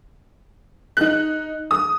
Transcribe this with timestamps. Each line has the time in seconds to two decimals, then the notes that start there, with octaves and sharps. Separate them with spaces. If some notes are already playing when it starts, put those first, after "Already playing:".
0.97 D#4 F#6
1.71 D#6